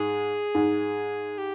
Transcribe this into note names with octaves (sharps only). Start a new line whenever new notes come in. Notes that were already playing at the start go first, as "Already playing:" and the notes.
Already playing: G#2 G#4
G#2
G4